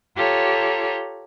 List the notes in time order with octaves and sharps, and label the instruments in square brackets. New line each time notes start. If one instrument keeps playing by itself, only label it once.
[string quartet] F4 G4 A4 C#5 A#5